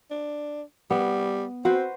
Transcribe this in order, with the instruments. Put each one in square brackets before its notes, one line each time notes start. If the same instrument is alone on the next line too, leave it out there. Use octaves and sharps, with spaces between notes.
[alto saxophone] D4
[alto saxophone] G3 [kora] B3
[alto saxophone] C4 [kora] F#4 B4 C5